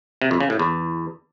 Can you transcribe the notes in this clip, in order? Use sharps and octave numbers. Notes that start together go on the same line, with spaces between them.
C3
F2
C#3
A2
E2